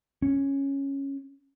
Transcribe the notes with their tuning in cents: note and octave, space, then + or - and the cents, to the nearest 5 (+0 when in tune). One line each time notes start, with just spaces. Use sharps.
C#4 -5